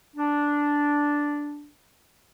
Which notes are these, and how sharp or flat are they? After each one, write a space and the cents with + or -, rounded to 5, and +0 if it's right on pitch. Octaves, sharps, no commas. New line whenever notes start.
D4 -5